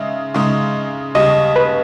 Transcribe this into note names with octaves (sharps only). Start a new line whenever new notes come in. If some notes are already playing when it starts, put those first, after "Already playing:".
Already playing: C#3 G#3 D#4 E5
C#3 G#3 D#4
D#2 C#3 G3 D#5
B4